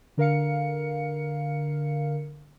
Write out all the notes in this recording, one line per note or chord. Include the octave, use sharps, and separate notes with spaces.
D3 A#4 F5 C#7